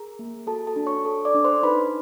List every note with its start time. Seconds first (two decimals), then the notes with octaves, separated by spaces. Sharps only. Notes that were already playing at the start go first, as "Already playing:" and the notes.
Already playing: G#4 A#4 A#5
0.19 A#3
0.47 F#4 A4 A5
0.67 A4 A5
0.76 D4
0.86 C#5 C#6
1.05 A4
1.25 D5 D6
1.35 D4
1.44 C5 C6
1.63 D#4 B4 B5